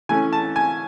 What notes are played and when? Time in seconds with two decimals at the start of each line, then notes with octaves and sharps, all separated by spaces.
0.09 E3 A3 C#4 G#5
0.33 A5
0.56 G#5